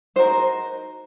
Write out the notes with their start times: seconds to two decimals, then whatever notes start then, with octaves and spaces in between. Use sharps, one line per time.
0.16 D#4 F#4 A#4 C5